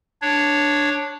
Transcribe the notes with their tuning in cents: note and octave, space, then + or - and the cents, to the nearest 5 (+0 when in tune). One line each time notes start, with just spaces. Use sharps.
D4 +0 C#5 +0